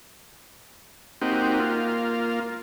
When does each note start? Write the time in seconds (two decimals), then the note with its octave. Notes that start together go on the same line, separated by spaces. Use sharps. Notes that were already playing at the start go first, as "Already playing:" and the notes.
1.22 A#3 C4 D#4 F#4 G4
1.60 A#3 F4